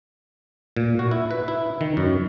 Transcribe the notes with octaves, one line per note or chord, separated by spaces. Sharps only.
A#2
F#4
E4
B4
E4
D#3
F#2